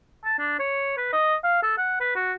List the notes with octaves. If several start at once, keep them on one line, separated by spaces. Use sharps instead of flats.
A5
D4
C#5
B4
D#5
F5
A4
F#5
B4
F#4